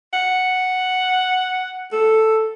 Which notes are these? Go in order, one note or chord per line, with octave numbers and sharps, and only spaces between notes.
F#5
A4